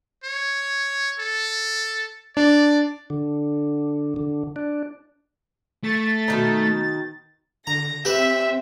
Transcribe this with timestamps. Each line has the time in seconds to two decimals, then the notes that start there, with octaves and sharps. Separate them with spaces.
0.24 C#5
1.19 A4
2.37 D4 D5
3.10 D3
4.16 D3
4.56 D4
5.84 A3 A6
6.28 B2 D#3 D#4
7.67 D3 A#5 A#6
8.05 C4 G4 B4 E5